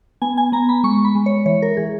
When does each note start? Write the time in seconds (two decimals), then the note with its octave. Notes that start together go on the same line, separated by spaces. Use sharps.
0.22 B3 G#5
0.37 G#5
0.52 B3 A#5
0.69 B5
0.84 G#3 C#6
1.05 B5
1.15 G#3
1.26 C#5
1.46 E3 C#5
1.62 A#4
1.77 E3 G#4